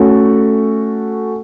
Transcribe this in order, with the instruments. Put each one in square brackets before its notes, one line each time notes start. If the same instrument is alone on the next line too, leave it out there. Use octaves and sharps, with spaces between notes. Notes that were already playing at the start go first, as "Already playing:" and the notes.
Already playing: [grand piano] A3 C#4 F#4 A4